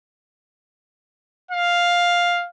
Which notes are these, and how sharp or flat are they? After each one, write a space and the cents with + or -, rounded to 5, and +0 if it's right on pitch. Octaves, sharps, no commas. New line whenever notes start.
F5 +5